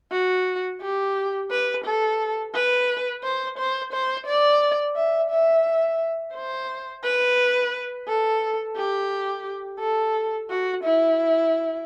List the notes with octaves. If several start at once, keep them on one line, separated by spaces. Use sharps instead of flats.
F#4
G4
B4
A4
B4
C5
C5
C5
D5
E5
E5
C5
B4
A4
G4
A4
F#4
E4